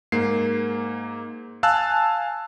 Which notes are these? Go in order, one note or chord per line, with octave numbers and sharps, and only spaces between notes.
G#2 A#3 C7
F5 G#5 A5 E6 F#6